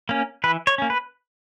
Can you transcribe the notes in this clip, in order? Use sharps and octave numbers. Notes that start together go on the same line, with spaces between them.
A#3 C#4
E3 B4
C#5
A#3 C#4
B4